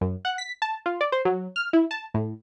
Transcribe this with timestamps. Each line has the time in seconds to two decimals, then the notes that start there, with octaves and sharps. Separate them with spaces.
0.01 F#2
0.25 F#5
0.38 B6
0.62 A5
0.86 F4
1.01 D5
1.12 C5
1.25 F#3
1.56 F6
1.73 E4
1.91 A5
2.14 A2